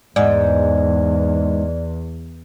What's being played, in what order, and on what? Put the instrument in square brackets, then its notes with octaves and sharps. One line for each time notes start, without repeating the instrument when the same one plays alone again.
[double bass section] E2 [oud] G#2 [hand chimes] D5